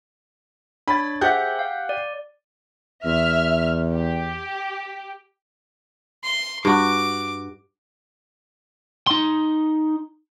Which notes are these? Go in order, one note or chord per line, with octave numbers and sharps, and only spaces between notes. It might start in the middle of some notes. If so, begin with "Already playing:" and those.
D4 C#5 B5 A6
G4 G#4 C5 E5 F#5 G6
F5
D5
E2 E5 F6
G4
C6
G2 F#4 D6
D#4 C6